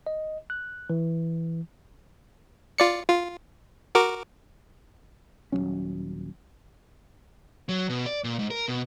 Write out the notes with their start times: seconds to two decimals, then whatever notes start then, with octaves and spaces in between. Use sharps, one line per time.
0.06 D#5
0.50 F#6
0.90 E3
2.78 F4 D5 C#7
3.09 F4
3.95 F#4 A#4 D6
5.52 D#1 F#2 F#3 C#4
7.69 F#3
7.89 B2
8.06 D5
8.24 A#2
8.39 G#2
8.50 A#4
8.68 B2